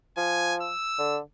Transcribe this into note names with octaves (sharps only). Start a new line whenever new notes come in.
F3 G#5
E6
D3